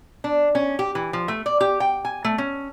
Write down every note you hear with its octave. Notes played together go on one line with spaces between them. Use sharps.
D4
C#4
G4
E3
F3
A3
D5
G4
G5
G#5
A3
C#4